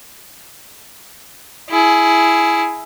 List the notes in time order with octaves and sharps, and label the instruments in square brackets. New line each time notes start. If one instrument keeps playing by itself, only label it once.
[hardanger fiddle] E4 G#4